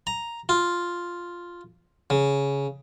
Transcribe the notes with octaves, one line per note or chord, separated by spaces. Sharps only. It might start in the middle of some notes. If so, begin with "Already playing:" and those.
A#5
F4
C#3